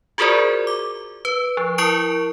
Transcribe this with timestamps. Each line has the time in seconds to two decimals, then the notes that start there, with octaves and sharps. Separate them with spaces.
0.18 F4 F#4 G#4 A#4 C5 D5
0.67 D6
1.25 B4
1.57 F3
1.78 E4 A#4 C#6 D7